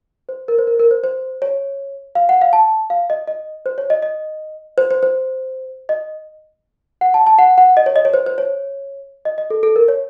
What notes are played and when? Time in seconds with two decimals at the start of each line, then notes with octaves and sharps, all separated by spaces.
0.29 C5
0.48 A#4
0.58 C5
0.67 A#4
0.79 A#4
0.91 C5
1.04 C5
1.42 C#5
2.15 F5
2.29 F#5
2.42 F5
2.53 A5
2.90 F5
3.10 D#5
3.28 D#5
3.66 C5
3.78 C#5
3.90 D#5
4.03 D#5
4.78 C5
4.91 C5
5.03 C5
5.89 D#5
7.01 F#5
7.14 A5
7.27 A5
7.39 F#5
7.58 F#5
7.77 D#5
7.86 C#5
7.96 D#5
8.05 C#5
8.14 C5
8.26 C5
8.38 C#5
9.25 D#5
9.38 D#5
9.50 A4
9.63 A4
9.76 A#4
9.88 C#5